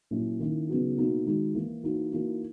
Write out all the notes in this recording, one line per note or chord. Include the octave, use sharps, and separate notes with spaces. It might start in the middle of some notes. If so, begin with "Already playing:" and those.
A#2 F#3 C#4 E4
D#3 A#3 C#4 E4
C#3 F#3 B3 D#4 F#4
B2 A#3 D#4 F#4
D#3 G#3 D#4 F#4
E3 A#3 E4
E3 A#3 D#4 F#4
E3 A#3 D#4 F#4